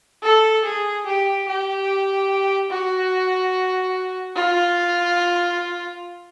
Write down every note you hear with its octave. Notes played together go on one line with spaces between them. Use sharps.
A4
G#4
G4
G4
F#4
F4